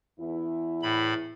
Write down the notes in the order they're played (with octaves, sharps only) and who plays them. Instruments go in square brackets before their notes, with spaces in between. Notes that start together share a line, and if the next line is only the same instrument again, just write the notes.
[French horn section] E2 E4
[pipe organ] A2 B5